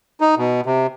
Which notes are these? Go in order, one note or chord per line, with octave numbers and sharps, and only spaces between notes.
D#4
B2
C3